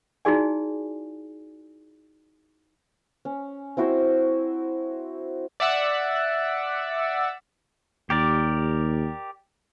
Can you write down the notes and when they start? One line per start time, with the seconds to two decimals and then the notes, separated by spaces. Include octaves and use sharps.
0.25 D#4 E4 F#4 G#4 D5 G#5
3.25 C#4
3.77 C4 E4 F#4 C5
5.60 D5 E5 F#5 E6
8.10 D#2 G4 A#4 D5